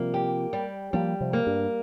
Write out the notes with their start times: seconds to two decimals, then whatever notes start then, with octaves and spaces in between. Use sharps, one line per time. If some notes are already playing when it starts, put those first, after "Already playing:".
Already playing: C3 F3 G3 A#3
0.14 G4
0.53 G3
0.93 F3 G3 A#3
1.21 C3 F3
1.33 A#3
1.47 G2